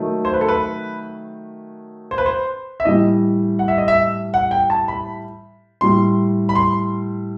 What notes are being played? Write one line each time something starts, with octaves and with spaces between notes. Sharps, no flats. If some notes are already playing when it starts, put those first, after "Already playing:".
Already playing: D#3 F#3 A3
C5
B4
A4
B4
C5
B4
C5
E5
A2 E3 G3 D#5
F#5
E5
D#5
E5
F#5
G5
A5
B5
A2 G3 C6
B5
C6